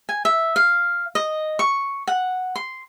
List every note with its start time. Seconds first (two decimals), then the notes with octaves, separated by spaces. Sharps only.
0.09 G#5
0.25 E5
0.56 F5
1.15 D#5
1.59 C#6
2.07 F#5
2.56 C6